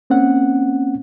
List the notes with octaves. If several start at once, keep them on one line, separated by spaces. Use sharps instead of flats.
A#3 C4 C#4 F#5